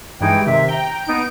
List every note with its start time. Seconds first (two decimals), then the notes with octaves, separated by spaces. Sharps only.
0.20 G2 E3 G#3 D#4 G5 G#6
0.46 C3 D#3 E5
0.68 G5 A#5
1.05 B3 D#4 D7